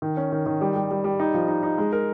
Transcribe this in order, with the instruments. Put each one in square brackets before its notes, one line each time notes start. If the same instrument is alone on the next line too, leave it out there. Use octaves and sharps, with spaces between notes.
[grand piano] D#3
C#4
D#3
D#3
G3
G3
G3
G3
D#4
F3
D#4
D#4
G#3
A#4